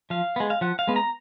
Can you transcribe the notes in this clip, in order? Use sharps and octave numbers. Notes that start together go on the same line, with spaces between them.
F3 F5
G#3 B3
F5
F3 F#5
F5
G#3 B3
A#5